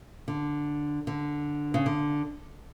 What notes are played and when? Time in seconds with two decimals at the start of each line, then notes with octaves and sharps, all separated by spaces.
0.28 D3
1.07 D3
1.74 C#3
1.86 D3